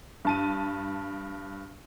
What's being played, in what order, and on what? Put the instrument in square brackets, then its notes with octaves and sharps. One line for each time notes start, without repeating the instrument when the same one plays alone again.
[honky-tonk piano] G2 A5 D#7